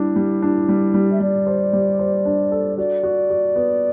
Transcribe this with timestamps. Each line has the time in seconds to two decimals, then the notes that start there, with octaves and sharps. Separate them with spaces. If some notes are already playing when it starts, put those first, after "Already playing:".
Already playing: G3 D4 E4
0.16 G3
0.42 D4
0.69 G3
0.94 G3
1.12 E5
1.20 G3 D5
1.47 C5
1.73 G3
1.99 C5
2.25 D4
2.52 A4
2.77 F#4 D5
3.03 F#4
3.30 F#4
3.56 B3